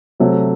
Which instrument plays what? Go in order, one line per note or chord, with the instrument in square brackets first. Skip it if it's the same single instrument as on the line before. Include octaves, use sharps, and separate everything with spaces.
[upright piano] C3 F#3 A3